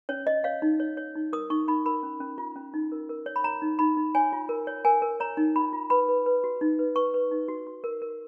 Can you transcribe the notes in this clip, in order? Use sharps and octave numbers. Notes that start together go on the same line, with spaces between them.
C#4 C#5
C#5 D#5
C#5 F5
D#4
C#5
C#5
D#4
A#4 D#6
D#4 C#6
D#4 B5
A#4 B5
C#4
C#4
F4
C#4
D#4
A#4
A#4
C#5
B5
C#5 A#5
D#4
D#4 B5
D#4
C#5 G#5
F4
A#4
C#5
A#4 G#5
A#4
C#5 A#5
D#4
F4 B5
F4
B4 B5
B4
B4
F#4
D#4
B4
B4 C#6
B4
D#4
F#4
F#4
A#4
A#4